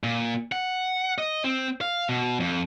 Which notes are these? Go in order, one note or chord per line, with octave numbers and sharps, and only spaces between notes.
A#2
F#5
D#5
C4
F5
B2
F2